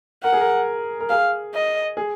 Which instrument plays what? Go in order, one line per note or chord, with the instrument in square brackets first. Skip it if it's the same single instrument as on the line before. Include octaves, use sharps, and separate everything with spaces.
[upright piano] A#4 [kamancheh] F#5
[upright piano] G#4
A#4
A#4
[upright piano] G#4 [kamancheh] F5
[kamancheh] D#5
[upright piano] G#4